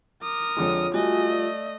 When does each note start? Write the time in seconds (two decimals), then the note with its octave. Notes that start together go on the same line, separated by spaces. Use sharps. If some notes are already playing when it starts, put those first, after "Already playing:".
0.23 A#4 D6 D#6
0.57 F2 D3 G#3 F4 C#5
0.94 G3 A3 F4 F#4 D#5 G#5
1.30 D5